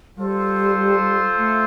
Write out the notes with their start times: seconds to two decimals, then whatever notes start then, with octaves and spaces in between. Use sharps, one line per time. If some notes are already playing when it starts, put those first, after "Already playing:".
0.17 G3 F4 A4 C5
1.38 A3